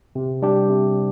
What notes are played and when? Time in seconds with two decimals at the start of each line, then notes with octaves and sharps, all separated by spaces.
0.15 C3
0.42 G3 D4 G4
0.70 C3